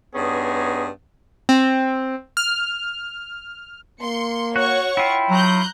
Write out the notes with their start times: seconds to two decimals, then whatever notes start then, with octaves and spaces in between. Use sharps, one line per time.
0.15 G2 B3 C#4 D#4 G#4
1.49 C4
2.37 F6
4.01 A#3 C6 C#7
4.56 F#4 C#5 F#5 C#6
4.97 E4 F4 G5
5.30 F#3 A#5 F#6 G6